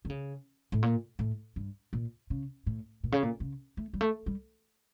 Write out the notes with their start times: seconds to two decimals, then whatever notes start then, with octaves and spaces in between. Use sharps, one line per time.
0.05 D3
0.10 C#3
0.72 A2
0.83 A#2
1.19 A2
1.56 G2
1.93 A#2
2.30 C#3
2.66 A2
3.04 A#2
3.12 C#3
3.23 A#2
3.40 C#3
3.77 A3
3.93 G3
4.01 A3
4.26 G3